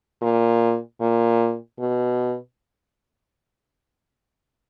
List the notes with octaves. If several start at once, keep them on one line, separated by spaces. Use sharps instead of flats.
A#2
A#2
B2